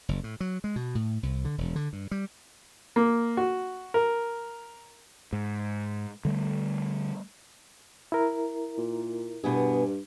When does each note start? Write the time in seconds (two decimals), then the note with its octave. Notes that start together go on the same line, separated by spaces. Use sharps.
0.09 F#1
0.23 A2
0.40 F#3
0.64 G#3
0.76 B2
0.95 A2
1.23 C2
1.45 D3
1.58 E1
1.76 D3
1.93 G2
2.11 G3
2.96 A#3
3.37 F#4
3.94 A#4
5.33 G#2
6.25 D3 G3 A3
8.12 E4 A#4
8.78 A#2
9.44 G2 B2 B3 G#4